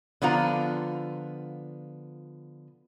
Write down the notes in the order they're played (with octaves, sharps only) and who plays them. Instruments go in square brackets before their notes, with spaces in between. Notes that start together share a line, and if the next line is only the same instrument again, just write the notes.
[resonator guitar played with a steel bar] D3 F3 B3 F4 A#5